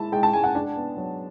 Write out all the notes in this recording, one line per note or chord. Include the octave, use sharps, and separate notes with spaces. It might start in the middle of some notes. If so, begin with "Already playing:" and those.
Already playing: G#3 E4 A5
G#3 G5
A5
G#3 G#5
F#5
D4 A5
B3
F#3